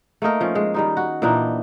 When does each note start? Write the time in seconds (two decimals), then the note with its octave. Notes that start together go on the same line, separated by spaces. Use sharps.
0.22 A3 A#3 D#4 A#4
0.41 F3 C#4
0.55 G#3
0.74 D#3 G3 D#4
0.97 F#4
1.22 A#2 E3 D4 D#4